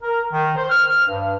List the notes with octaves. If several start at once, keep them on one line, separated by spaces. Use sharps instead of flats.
A#4
D#3
C5
F6
G2